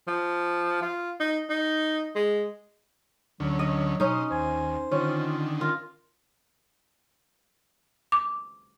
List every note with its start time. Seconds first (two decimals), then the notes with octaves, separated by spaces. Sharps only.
0.08 F3
0.82 F4
1.20 D#4
1.49 D#4
2.16 G#3
3.40 D2 D3 F#3 C#4
3.59 D#5
4.00 B2 C#4 D#4 C5 D#5
4.31 D#2 C5 G#5
4.92 D3 D#3 C#4 F4
5.61 F4 A#4
8.12 D6